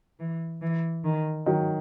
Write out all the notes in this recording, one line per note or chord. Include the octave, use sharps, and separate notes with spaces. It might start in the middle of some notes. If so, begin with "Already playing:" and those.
E3
E3
D#3
D#3 F#3